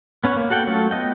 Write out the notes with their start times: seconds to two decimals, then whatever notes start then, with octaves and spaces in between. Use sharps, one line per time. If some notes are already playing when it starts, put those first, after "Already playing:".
0.24 B3 C#4 B4 C#5
0.37 A#3
0.50 F#4 A4 F#5 G5
0.67 F#3 A3 C#4 F4 A4
0.91 B3 D#5 G5